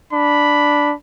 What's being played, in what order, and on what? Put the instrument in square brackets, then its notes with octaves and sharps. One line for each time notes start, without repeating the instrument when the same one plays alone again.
[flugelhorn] D4 [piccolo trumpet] B5